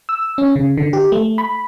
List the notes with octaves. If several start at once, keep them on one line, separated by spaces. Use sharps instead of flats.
E6
C#4
C#3
D3
G4
A3
B5